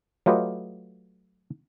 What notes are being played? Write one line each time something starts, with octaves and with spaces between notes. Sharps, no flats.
F#3 A3 F4 G4 B4 D#5